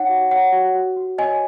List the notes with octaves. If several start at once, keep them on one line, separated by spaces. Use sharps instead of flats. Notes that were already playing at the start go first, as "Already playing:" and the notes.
Already playing: D#4 C#5 F#5
F#4
C#5 F#5
F#4
F#4
F#4
C#5 D#5 G#5